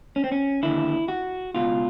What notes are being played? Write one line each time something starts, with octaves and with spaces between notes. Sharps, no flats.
C#4
C4
C#4
D#2 D3 E4
F#4
C#2 B2 F4